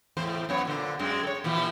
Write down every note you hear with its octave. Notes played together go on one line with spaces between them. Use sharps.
E2 A2 C5
F#2 B3 C#5
A#2 D3 C5
F#2 G#3 C4
A4 C#5
A#2 E3 F3